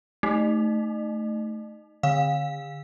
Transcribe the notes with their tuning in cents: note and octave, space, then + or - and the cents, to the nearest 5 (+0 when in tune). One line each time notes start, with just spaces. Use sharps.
A3 +0 D#4 +0
D3 +0 F5 +20